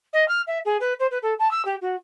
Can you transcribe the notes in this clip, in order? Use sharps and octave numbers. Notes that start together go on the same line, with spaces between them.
D#5
F6
E5
G#4
B4
C5
B4
A4
A5
E6
G4
F#4